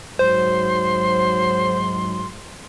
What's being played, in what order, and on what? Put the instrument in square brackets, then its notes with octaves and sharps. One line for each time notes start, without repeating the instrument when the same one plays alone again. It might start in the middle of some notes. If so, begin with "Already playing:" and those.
[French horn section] G#2 F#3 [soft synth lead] C5 [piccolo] C6